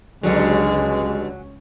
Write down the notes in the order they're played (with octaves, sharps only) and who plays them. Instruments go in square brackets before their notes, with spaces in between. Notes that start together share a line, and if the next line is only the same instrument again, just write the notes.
[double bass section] C#2 C#4 [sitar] G2 B2 D3 [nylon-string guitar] F#3 [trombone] G#3